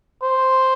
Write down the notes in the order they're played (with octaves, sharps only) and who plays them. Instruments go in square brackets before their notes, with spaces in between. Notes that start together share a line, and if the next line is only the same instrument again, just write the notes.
[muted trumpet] C5